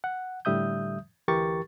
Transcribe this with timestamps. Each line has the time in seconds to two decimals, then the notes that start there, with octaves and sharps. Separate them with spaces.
0.04 F#5
0.45 A2 D3 G3 E5 D#6 G6
1.28 D2 E3 G4 A#4 C#6 A6